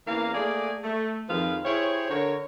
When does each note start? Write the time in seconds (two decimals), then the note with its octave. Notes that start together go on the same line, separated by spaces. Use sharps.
0.07 E2 E3 A#3 C#4 F5
0.35 A3 A#3 G#4 D5
0.84 A3
1.29 F2 D#3 F3 G#4 B4 F5
1.65 E4 G4 G#4 C5 C#5
2.09 D3 A#4 C#5